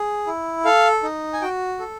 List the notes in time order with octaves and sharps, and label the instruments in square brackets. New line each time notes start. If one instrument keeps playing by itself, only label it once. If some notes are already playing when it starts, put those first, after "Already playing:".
Already playing: [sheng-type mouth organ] G#4
E4
A4 F5
D#4
G#5
F#4 G5
A4